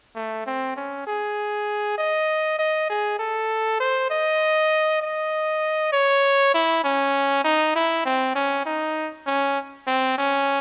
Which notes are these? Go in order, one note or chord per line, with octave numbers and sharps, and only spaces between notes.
A3
C4
C#4
G#4
D#5
D#5
G#4
A4
C5
D#5
D#5
C#5
E4
C#4
D#4
E4
C4
C#4
D#4
C#4
C4
C#4